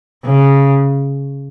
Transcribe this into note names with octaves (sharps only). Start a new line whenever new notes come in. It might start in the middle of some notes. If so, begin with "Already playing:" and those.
C#3